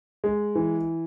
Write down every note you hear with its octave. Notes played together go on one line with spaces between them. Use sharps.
G#3
E3